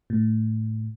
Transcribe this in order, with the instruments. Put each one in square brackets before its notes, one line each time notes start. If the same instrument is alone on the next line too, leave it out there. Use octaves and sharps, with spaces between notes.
[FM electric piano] A2